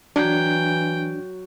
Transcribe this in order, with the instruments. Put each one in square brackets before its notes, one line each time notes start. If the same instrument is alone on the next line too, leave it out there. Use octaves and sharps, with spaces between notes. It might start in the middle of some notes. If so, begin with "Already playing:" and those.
[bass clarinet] E3 [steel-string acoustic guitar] F#3 [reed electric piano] D4 [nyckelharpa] G5